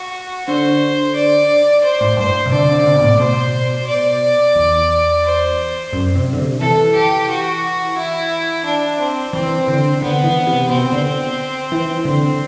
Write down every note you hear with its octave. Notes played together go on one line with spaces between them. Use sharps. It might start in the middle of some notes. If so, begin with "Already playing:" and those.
Already playing: F#4
D3 C5
D5
C5
A2
G2 C5
C3
D3 D5
D3
D3
C3
B2
A2
B2 C5
D5
E2
C5
F#2
C3
D3
C3
E3 A4
G4
F#4
E4
D4
C4
E3 C4
D3
D3 B3
E3
C3
B2 C4
D3
E3
D3 C4